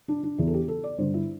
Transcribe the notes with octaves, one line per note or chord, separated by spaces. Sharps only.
D4
D4
E2 E3 E4
A4
G4
A4
D5
G2 D3 C5
E4